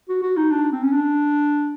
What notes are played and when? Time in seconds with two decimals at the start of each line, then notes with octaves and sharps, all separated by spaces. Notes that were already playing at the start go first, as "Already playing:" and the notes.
0.09 F#4
0.22 F#4
0.37 D#4
0.51 D4
0.72 C4
0.83 C#4
0.93 D4